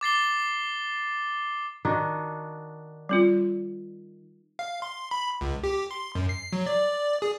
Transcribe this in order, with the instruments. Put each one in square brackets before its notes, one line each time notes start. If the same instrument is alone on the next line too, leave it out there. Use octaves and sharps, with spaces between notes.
[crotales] D6 A6 C7 G7
[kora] D#3 D4 F#4
[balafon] G3 C4 F4
[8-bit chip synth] F5
C6
B5
C#2
G4
C6
F#2
C7
F#3
D5
G#4